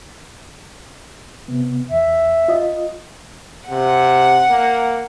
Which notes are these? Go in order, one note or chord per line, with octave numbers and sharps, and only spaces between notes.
C3 B3
E2 E5
F4 D#5
C3 F#5
A#3